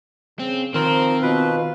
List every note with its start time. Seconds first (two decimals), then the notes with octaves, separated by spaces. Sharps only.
0.39 C#3 C4
0.74 D#3 F3 C4 A#4 C5
1.22 B2 F4 B4